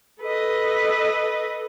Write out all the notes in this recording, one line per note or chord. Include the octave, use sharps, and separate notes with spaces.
A4 B4 D#5